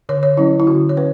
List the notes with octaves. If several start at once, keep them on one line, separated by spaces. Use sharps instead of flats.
D3 C#5
C#5
F#3 C#4 E4
E4
D3 F#4
C#5
C#4 B4